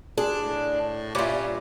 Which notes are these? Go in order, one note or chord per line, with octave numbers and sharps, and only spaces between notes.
G#3 D4 G#4
A2
G2 A#2 G3 C#4 F4 E5 D6